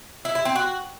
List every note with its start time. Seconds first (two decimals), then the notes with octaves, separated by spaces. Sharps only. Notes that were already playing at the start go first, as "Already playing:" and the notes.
0.25 E4
0.35 E4
0.45 C4
0.56 F#4